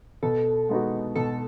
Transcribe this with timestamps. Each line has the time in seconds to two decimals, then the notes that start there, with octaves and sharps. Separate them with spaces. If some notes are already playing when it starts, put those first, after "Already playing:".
0.23 B2 A4
0.69 G#3 B3 D#4 F#4
1.15 B2 A4